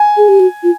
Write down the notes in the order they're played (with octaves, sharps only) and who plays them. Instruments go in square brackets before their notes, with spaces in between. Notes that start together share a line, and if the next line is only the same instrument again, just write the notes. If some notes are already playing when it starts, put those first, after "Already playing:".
Already playing: [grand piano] G#5
[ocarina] G#4
G4
F#4
F4